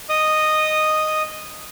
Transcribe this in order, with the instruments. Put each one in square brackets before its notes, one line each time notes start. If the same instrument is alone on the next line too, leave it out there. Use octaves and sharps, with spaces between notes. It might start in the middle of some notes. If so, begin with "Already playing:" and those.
[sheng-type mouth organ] D#5 D#6